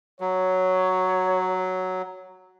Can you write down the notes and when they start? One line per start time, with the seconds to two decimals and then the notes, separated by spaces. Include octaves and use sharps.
0.21 F#3 C#5